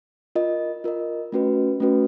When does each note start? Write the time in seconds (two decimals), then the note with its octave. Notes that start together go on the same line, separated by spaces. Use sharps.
0.35 F4 A#4 D#5
0.84 F4 A#4 D#5
1.32 A3 C#4 F#4 B4
1.80 A3 C#4 F#4 B4